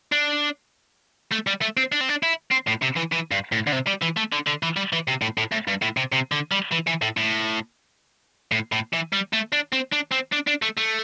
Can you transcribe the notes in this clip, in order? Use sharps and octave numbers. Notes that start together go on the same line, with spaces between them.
D4
A3
G3
A3
C4
D4
C4
D4
E4
C4
A2
C3
E3
E3
G2
A2
D3
C3
G3
E3
A3
D3
D3
E3
G3
E3
C3
A2
A2
A2
G2
A2
C3
C3
D3
G3
E3
E3
A2
A2
A2
A2
E3
G3
A3
D4
C4
D4
C4
D4
D4
A3
A3